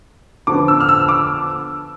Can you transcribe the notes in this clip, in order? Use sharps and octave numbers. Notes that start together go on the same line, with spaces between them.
D3 F3 B3 D6
E6
F6
E6
D6